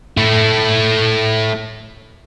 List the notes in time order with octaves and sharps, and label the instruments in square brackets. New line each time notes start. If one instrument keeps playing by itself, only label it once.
[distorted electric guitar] A3 E4